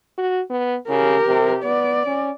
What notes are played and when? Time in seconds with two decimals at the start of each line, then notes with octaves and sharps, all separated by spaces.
0.18 F#4
0.50 B3
0.89 C#3 G4 A#4
1.27 C3
1.63 B3 D5
2.06 C#4